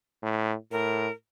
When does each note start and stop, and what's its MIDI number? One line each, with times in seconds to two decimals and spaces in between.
0.22 0.55 45
0.72 1.08 45
0.72 1.11 70